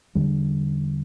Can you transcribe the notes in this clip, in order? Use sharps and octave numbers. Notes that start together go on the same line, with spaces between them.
E2 D3 G3